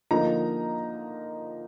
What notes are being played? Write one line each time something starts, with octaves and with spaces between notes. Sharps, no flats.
D3 F3 A#3 D#4 A#5